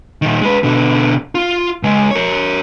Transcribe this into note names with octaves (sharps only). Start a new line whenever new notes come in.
A#2 D#3
G#3 B4
B2 D3
F4
C#2 G#3
A#4 C#5